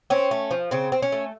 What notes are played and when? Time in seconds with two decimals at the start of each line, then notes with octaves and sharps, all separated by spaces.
0.10 C4 C#4
0.31 A3
0.51 F3
0.71 C#3 C4
0.92 C4
1.02 C#4
1.12 A3